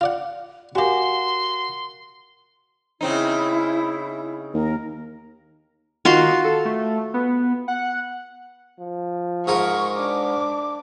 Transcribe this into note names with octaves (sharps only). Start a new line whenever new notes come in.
F4 D5 F#5
F#4 G4 A#4 F5 G#5 C6 C#6
C#3 C4 D#4 E4
D#2 A#4
D#3 F4 F#4 C6
A4
A3
B3
F#5
F3
G#2 G#4 A#4 C#6
D4 D6